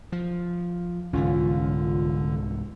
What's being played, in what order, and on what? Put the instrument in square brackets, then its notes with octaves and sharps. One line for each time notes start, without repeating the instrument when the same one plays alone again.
[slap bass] F3
[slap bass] C2 G#2 E3 [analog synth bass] D3 [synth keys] C#4 F4